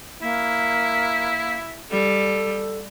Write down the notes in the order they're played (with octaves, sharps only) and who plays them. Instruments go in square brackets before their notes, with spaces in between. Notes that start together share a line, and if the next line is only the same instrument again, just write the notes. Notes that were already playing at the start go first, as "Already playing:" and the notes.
[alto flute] A#3 [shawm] E4
[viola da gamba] G3 [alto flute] A4